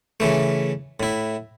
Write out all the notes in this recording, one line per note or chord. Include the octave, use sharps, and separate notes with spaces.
C#3 E3 A3
A2 E4